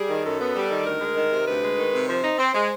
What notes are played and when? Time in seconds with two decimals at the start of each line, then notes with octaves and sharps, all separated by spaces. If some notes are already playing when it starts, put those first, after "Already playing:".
Already playing: G3 G#4
0.10 D#3
0.24 F#2 A4
0.40 B3
0.56 G3
0.71 D#3
0.85 D2 A#4
1.01 G#3
1.16 D#3
1.32 C3
1.47 D2 B4
1.63 G#3
1.78 D#3
1.94 C3
2.08 F3 C5
2.23 D#4
2.39 C4
2.54 G#3